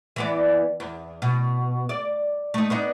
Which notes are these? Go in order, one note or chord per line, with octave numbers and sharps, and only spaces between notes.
E3 B3 D5
E2
B2
D5
A3 D#4
B3 D4 D#4